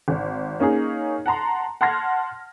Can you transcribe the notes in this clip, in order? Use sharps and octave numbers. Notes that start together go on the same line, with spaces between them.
G#1
A#3 C#4 D#4 G#4
F#5 A5 A#5 C6
F#5 A5 C6 F6 G#6 A#6